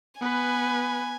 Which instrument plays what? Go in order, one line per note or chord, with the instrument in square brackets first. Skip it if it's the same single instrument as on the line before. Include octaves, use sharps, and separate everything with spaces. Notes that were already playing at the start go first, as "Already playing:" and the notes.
[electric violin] B3 B4 [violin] G#5